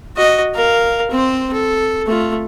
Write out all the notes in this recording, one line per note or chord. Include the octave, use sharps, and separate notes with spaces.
F#4 D#5
A#4 F5
C4 C5
A4
A3 F4